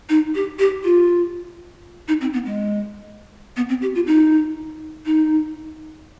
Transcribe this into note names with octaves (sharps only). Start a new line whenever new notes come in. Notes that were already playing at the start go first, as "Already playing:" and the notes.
D#4
G4
G4
F4
D#4
C4
B3
G#3
B3
C4
G4
F4
D#4
D#4